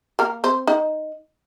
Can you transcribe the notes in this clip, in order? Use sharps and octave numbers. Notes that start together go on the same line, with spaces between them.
A#3 A#4
C4 C5
D#4 D#5